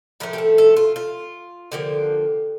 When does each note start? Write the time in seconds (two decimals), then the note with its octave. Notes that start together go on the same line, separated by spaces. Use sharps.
0.20 A2 F3 A3 A#4
0.33 G4
0.38 A4
0.58 A4
0.76 F4
0.96 F4
1.72 D3 F3 A#3 G4